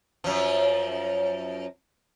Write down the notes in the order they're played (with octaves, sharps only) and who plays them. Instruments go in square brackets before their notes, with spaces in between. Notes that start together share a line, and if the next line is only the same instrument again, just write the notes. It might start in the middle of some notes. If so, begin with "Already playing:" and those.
[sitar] F#2 F3